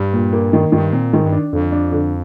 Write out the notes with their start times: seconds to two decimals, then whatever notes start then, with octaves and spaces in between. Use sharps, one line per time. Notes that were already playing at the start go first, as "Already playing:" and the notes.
Already playing: G2 G3
0.13 A#2
0.33 A#3
0.53 D#3
0.72 G2 D#3
0.93 A#2 C4
1.13 G#2 D#3
1.26 G2
1.32 D4
1.53 F2 D3
1.72 D4
1.92 D3